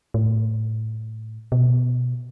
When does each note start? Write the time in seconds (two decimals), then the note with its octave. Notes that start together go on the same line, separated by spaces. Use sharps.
0.14 A2
1.52 B2